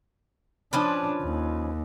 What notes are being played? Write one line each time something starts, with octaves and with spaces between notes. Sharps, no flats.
F3 C#4 D4 B4
D#2